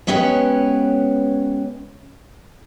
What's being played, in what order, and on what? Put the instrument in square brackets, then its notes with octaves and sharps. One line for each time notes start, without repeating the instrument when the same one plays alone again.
[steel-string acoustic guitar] G#3 B3 C#4 G4 B4 C#5